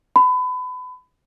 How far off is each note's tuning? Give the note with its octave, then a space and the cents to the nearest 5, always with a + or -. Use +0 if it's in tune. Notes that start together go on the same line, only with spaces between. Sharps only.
B5 +30